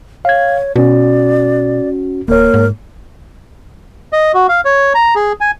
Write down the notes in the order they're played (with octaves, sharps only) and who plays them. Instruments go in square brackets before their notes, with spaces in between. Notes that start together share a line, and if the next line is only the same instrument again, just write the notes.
[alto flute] C#5 [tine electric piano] F5 G#6
[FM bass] B2 [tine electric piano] C#4 F#4 [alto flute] D5
[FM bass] D1 [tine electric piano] A#3 C#5 [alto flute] A#4
[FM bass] G#2
[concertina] D#5
F#4
F5
C#5
A#5
G#4
G#5